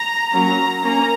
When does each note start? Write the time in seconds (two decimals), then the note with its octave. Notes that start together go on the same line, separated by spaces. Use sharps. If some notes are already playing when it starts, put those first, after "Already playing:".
Already playing: A#5
0.33 F#3 A#3 C#4 A#5
0.82 A#3 C#4 A#5